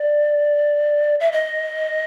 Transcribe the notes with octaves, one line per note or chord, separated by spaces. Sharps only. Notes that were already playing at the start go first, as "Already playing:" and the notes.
Already playing: D5
E5
D#5